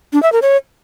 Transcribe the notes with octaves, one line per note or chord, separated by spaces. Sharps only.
D4
E5
A#4
C#5